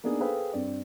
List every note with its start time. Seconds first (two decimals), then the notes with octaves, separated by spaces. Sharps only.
0.04 A#3 B3 D4 D#4 G#4
0.20 G#4 A4 B4 C5 F5 G5
0.53 G2 C4 D5